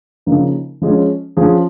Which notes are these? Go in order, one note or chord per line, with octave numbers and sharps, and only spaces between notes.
C#3 F3 A#3 D#4
F3 G#3 C#4
F3 C#4 G#4